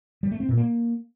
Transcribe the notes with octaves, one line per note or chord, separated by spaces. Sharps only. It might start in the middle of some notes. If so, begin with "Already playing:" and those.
G3
A3
C4
A#2
A#3